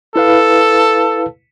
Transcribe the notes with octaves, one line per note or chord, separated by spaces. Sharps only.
E4 A4 B4 F5